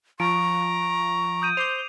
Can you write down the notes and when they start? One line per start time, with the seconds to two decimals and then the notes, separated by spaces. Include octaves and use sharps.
0.20 F3 A#5 C#6 D7
1.42 D#6 G6 D#7
1.57 C5 D6 G6 C7 F7